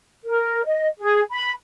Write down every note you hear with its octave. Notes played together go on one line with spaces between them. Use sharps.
A#4
D#5
G#4
B5